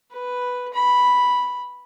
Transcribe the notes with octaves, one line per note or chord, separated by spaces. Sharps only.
B4
B5